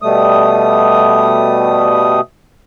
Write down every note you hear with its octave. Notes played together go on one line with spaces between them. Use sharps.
B2 G3 A3 D#6